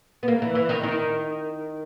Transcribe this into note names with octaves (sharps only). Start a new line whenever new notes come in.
B3
A#3
E3
E3
D#3
D#3